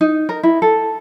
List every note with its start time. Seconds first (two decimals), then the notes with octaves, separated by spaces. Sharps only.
0.01 D#4
0.29 A#4
0.43 E4
0.62 A4